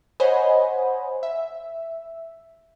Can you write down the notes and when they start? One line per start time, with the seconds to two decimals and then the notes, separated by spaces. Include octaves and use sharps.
0.20 C5 C#5 D#5 F#5 G#5 B5
1.23 E5